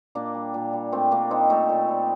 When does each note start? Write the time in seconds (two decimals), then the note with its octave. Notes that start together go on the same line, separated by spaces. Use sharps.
0.15 A#2 A#3 D4
0.34 G3
0.54 A#2
0.73 G3
0.92 A#2 A3 C4
1.11 G3 A#3 D4
1.30 G3 C4 D#4
1.50 A#2 A3
1.69 A#2
1.88 G3